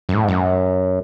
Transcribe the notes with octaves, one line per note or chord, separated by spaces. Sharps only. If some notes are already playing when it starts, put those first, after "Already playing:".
F#2
G#2
A2
G#2
F#2